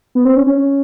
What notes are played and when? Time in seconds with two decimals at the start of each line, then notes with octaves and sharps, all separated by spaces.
0.15 B3
0.25 C4
0.36 C#4
0.47 C#4